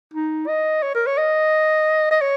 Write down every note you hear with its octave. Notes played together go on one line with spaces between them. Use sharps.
D#4
D#5
C#5
A#4
C#5
D#5
D#5
C#5